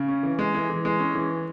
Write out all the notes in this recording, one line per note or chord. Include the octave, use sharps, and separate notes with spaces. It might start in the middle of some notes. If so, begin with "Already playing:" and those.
Already playing: C#3
C#4
E3
G#3
E3
E3
G#3
C#4
E3